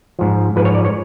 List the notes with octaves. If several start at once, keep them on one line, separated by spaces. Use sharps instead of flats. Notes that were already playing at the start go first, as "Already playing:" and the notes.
G#2 F3
G#2 F3 B4
C#5
D5
C#5